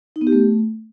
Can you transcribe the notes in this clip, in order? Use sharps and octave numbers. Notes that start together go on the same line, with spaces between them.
D#4
B3
G4
A3